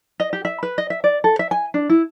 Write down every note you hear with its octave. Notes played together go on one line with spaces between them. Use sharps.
D#5
G4
E5
B4
D#5
E5
D5
A4
E5
G#5
D4
E4